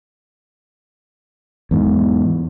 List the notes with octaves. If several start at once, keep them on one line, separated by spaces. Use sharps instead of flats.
E2 G#2